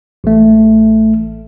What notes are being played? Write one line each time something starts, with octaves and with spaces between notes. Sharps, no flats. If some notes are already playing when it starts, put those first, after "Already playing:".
A1 A3